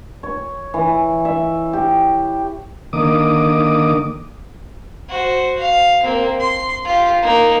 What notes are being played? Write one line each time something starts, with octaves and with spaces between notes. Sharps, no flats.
C#5
E3
E5
G4
D3 D#3 A#3 D6 D#6
F#4 C5
F5
A#3 C4
C6
F4 G4
A#3 D#4